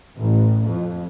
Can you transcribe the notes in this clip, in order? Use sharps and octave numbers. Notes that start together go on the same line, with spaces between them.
A1
F2